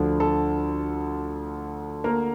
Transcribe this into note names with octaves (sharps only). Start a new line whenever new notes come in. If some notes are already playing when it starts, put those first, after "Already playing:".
Already playing: D2 D3 F3
A4
A#3 A#4